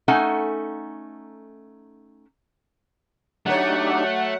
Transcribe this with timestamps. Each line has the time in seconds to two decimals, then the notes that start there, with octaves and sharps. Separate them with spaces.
0.08 A3 C#4 D#4 A4 F#5 G#5
3.46 F#3 A3 D4 D#4 G4 C#5 F#5